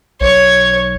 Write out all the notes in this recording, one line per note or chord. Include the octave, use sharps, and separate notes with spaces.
B1 C#5